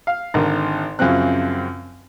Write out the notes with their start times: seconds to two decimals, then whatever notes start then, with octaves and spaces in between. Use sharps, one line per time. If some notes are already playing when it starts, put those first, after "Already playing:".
0.07 F5
0.34 G#1 D3 A#4
0.99 F#2 C#3 F3 C4 F#6